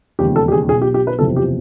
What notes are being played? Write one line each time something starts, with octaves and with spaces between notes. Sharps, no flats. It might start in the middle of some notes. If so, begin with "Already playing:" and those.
E1 D#2 C#3 F3 G4
A4
G4
G#4
B1 B2 G#4
G4
G4
B4
F#1 E2 C3 F3 A4
G4